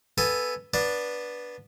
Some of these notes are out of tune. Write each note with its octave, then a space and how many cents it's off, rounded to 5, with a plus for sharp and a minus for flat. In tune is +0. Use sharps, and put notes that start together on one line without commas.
B3 +0 A4 +0 G#5 +0
B3 -10 D4 +0 D5 +0